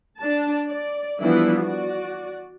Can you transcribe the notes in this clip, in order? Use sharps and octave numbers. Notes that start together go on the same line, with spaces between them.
D4 A5
D5
E3 F3 G3 B3 D4 E4
F#4 D5